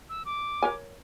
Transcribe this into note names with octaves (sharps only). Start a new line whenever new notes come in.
E6
D6
A#4 C#5 G#5